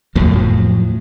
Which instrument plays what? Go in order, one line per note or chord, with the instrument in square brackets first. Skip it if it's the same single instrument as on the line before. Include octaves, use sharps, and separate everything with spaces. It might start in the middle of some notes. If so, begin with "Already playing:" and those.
[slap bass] F2 A2 F3 F#3